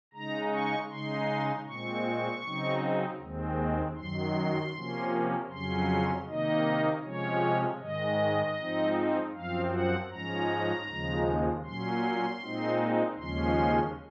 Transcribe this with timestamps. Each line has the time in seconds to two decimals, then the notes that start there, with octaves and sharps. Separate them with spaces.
0.13 C#3 G#3 D#4 A#5
0.52 C#6
0.90 C#3 G#3 D#4 C6
1.67 A#2 G#3 C4 C#6
2.44 C#3 F#3 C4 D#4
3.20 D#2 D#3 G#3 C4
3.97 F#2 D#3 F#3 C6
4.74 C3 F3 A#3 C#4
5.51 F2 C#3 F#3 C#4 C6
6.27 C3 D#3 A#3 D#4 D#5
7.04 C3 F3 G#3 C#4 C#5
7.81 G#2 D#3 G#3 D#5
8.58 G#2 F3 C4 D#4
9.34 F#2 F3 C4 F5
9.72 F#5
10.11 G#2 F3 G#3 C#4 A#5
10.88 D#2 C#3 F3 G#3
11.65 A#2 F#3 C#4 C6
12.41 A#2 G#3 C4 D#4
13.18 D#2 C#3 F3 G#3 C#4 C6